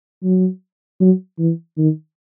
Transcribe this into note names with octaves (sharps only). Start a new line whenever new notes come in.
F#3
F#3
E3
D#3